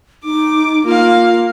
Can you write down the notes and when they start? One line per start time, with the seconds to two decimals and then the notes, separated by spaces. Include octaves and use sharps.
0.25 D#4 D6
0.84 A#3 F4 F5